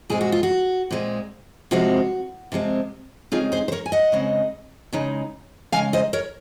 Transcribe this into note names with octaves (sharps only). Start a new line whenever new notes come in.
A#2 G#3 C4 G#4
F#4
F4
F#4
A#2 G#3 C4
C3 F3 G#3 C4 F#4
C3 F3 G#3 C4
C#3 G#3 C4 D#4 F4 G#4
G#4 C5
C5
A#4 C#5
G#5
D#5 F#5
C#3 G#3 C4 D#4
C#3 G#3 D#4
C#3 G#3 D#4 F5 G#5
C5 D#5
A#4 C#5